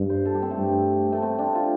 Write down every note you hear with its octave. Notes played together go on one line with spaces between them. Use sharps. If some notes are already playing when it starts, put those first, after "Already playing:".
Already playing: G2
C5
A4
G4
C4
A3
G2
A3
C4
D4
F4